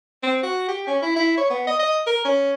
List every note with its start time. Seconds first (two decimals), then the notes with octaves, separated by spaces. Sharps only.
0.23 C4
0.43 F#4
0.68 G4
0.87 C#4
1.02 E4
1.16 E4
1.37 C#5
1.50 B3
1.67 D#5
1.79 D#5
2.07 A#4
2.25 C#4